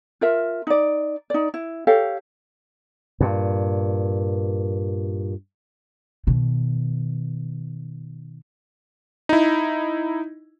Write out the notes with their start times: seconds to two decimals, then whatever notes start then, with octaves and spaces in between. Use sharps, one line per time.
0.21 F4 A#4 E5
0.67 D#4 D5
1.30 D#4 D5
1.54 E4
1.87 G4 A4 C#5 F5
3.20 G2 A#2
6.27 B2 D#3
9.29 D#4 E4